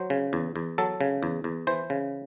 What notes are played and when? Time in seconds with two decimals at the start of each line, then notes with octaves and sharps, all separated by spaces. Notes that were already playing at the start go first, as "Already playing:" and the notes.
Already playing: F#3 C5
0.10 C#3
0.33 E2
0.56 E2
0.78 F#3 A4
1.01 C#3
1.23 E2
1.44 E2
1.67 E3 C5
1.90 C#3